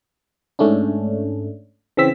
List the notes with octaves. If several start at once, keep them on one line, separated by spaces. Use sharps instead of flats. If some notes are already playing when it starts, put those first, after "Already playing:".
G#2 A3 C#4 D4
C#3 E3 C4 E6 B6